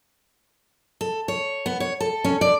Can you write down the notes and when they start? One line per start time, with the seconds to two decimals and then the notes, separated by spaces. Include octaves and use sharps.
1.01 A4
1.28 C#5
1.66 B3
1.80 C#5
2.01 A4
2.24 C#4
2.41 D5